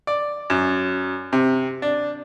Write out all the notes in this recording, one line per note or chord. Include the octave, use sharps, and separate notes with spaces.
D5
F#2
C3
D4